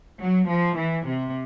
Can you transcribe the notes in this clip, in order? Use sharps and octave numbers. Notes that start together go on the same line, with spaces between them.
F#3
F3
E3
C3